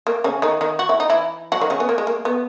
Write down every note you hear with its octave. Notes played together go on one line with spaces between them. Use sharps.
A#3
C#3 C#4
D#3 D#4
D#3 D#4
F#4
E4
D#4
E3 E4
F#3 F#4
D#3 D#4
C#3 C#4
B3
A#3
G#3
A#3
B3